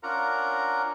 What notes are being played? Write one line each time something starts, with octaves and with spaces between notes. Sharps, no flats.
C#4 D4 F4 A#4 F#5 A#5